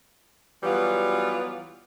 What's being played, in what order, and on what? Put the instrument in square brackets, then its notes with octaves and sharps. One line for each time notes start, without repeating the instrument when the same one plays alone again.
[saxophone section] E3 F#3 G3 B3 F4